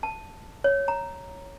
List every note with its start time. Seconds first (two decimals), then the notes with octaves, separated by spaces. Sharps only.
0.03 A5
0.64 C#5
0.88 A#5